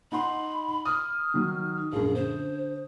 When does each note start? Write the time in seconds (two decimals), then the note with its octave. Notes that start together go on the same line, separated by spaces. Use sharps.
0.12 D#4 F#5 B5 C6
0.85 D#6 F6
1.34 D#3 F#3
1.93 A#1 F#2 G#4
2.15 D3 C5